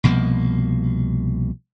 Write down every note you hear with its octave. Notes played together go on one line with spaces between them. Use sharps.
C2 B2 F3 A#3